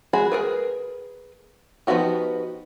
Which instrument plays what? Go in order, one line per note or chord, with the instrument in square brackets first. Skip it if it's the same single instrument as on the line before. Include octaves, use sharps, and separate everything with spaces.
[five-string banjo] G#3 F#4 G#4 B5
G#4 A#4 B4
F3 B3 D#4 F#4 G4